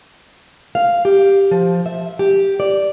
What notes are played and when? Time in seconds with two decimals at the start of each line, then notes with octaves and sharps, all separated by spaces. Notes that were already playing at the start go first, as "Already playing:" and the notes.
0.75 F5
1.05 G4
1.51 F3
1.86 E5
2.19 G4
2.60 D5